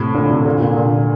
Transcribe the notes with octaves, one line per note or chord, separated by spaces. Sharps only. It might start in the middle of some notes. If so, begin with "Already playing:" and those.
Already playing: A2 C3
A#2 D3
A2 C3
A#2 D3
A#2 D3
A#2 D3